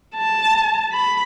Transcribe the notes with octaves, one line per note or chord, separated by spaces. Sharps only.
A5
B5